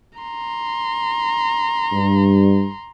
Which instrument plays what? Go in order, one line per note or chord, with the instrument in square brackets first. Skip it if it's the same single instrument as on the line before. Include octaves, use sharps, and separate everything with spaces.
[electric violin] A#5 C6
[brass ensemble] G2